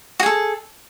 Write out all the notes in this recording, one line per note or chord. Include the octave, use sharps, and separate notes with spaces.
F#4 G#4 A4